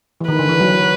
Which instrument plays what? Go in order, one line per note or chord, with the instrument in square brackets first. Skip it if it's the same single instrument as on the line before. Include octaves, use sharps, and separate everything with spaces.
[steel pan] E3
[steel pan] D#3 [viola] B4
[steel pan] D3
E3
F#3
F#3